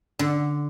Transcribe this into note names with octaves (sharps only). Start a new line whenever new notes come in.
D3